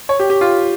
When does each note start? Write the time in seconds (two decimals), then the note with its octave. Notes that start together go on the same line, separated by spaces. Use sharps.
0.09 C#5
0.20 G4
0.30 G4
0.41 F4